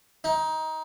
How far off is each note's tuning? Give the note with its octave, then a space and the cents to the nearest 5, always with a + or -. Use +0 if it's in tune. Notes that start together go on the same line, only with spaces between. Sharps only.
D#4 +20